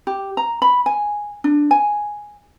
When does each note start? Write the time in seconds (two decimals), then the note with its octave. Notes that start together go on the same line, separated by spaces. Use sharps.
0.07 G4
0.37 A#5
0.62 B5
0.86 G#5
1.44 D4
1.71 G#5